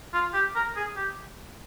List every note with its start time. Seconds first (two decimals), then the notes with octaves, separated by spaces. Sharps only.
0.13 F4
0.34 G4
0.55 A#4
0.76 G#4
0.96 G4